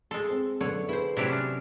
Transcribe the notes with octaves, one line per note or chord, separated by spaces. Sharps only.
G#3 A4 C6
C4
F#2 B2 D3 C#5
E4 G#4 B4 C5 D5
C3 F#3 D4 E4 G4
C#4 D4